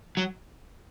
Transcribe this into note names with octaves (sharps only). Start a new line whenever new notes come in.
F#3